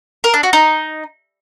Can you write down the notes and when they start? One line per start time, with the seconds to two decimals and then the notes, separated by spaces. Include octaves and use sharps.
0.24 A#4
0.34 D4
0.43 F#4
0.53 D#4